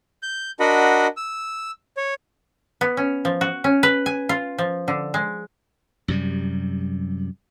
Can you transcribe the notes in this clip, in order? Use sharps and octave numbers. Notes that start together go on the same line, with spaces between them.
G6
D4 F#4 A#4 D#5 F#5 B5
E6
C#5
B3
C#4
F3
F#4
C#4
B4
G#5
F4
F3
D3
G#3
F#2 C3 G3